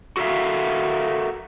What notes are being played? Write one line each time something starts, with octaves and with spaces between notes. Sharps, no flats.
F#4 A4 A#4 C#5 E5 F5